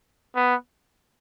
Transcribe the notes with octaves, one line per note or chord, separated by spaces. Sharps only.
B3